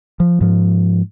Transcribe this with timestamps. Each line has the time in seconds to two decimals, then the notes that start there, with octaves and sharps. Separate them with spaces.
0.20 F3
0.41 G#2 F3